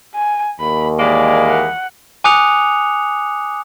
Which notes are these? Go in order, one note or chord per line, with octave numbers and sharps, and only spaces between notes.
G#5
D#2 B5
E3 G#3 A#3 D5
F#5
G#5 D6 D#6 F#6 C#7 F7